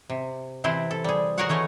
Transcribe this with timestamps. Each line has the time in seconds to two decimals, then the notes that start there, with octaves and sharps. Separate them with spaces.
0.10 C3
0.64 C3 E3 C4 E4 C5
0.91 A4
1.04 G3 G#4
1.38 F#4 G#4 A#4 C#5 F5 F#5
1.49 E3 A3 C#5 D#5